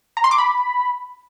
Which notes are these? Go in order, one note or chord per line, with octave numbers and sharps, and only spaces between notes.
A#5
C6
D6
B5